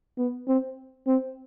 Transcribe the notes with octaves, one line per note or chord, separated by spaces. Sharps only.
B3
C4
C4